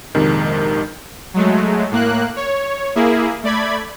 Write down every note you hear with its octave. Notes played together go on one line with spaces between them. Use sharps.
A#1 F2 C3 D#3 G#3
F#3 G#3 A3
A2 A#3 F#6
C#5
A#3 E4 G#4
A3 D5 B5 G#6